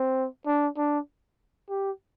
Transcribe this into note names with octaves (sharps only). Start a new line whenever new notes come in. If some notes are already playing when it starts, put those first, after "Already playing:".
Already playing: C4
D4
D4
G4